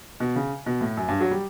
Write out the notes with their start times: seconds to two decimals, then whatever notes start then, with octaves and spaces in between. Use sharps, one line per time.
0.20 B2
0.36 C#3
0.66 B2
0.81 A2
0.97 F#2
1.08 G2
1.20 F#3
1.31 G3